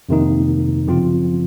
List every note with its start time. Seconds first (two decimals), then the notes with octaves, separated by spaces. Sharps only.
0.09 F2 C3 D#3 A#3 D#4
0.88 F#2 C#3 F3 C4 F4